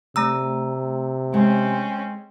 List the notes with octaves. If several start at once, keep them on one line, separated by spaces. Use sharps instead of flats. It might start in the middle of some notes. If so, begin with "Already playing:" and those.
C3 A3 A#5 E6
G#3 C4 C#4 G#4 F#5